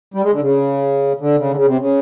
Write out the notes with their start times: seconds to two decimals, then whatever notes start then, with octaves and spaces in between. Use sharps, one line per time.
0.14 G3
0.23 G#3
0.33 D3
0.41 C#3
1.20 D3
1.38 C#3
1.51 D3
1.56 C#3
1.67 C3
1.79 C#3